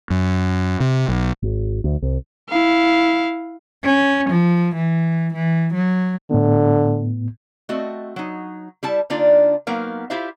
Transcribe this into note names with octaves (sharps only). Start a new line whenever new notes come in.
F#2
C3
B1
G#1
D2
C2
E4 F5
C#4
F3
E3
E3
F#3
A2 D3 B3
A3 C4 F#4 D#5
F#3 D#4
G3 E4 A5
D3 A#3 D4 D#4 F4 D5
F#3 A#3 B3 D#4 A#4 F5
E4 F4 G4 C5 E5 F5